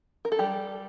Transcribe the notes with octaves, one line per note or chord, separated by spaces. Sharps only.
A#4
A4
G3 G4